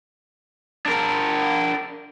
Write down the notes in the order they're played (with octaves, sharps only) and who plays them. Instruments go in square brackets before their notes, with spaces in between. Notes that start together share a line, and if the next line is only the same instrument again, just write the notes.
[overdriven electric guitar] D4 A#4